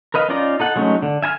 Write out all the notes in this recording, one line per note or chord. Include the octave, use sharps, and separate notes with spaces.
A#4 B4 D#5 F5
C#4 D#4 F4 D5 A#5
D#4 A4 F#5
F#3 G#3 A3 C#4 D#4
D3
E5 G#5 A#5 F6